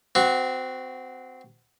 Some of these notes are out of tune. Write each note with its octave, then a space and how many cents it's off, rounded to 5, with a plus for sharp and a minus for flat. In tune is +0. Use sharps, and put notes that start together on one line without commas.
C4 -20 F#4 +0